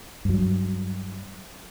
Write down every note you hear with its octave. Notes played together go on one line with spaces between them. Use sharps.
G2 F#3